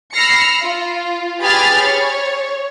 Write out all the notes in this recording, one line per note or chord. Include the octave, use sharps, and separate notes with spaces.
B5 E6 F6 A#6 C7 C#7
F4
G4 G#4 B4 B5 F6 A6
C#5